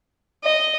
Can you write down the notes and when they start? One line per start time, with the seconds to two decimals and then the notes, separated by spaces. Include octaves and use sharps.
0.44 D#5